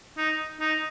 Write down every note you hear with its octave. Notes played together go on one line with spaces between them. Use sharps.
D#4
D#4